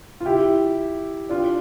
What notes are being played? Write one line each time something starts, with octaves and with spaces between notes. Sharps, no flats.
F4
E4 G4
D4 F4